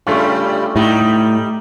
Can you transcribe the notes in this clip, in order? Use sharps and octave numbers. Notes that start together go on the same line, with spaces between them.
G2 C#3 G3 A3 C#4 F4
A2 G3 D#4